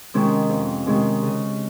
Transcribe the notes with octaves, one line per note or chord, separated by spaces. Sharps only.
C3 D#3 G#3 C#4
F2
C3 D#3 G#3 C#4
C#3